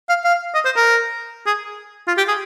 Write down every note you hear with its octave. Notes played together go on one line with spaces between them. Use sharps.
F5
F5
D#5
C5
A#4
G#4
F4
G4
G#4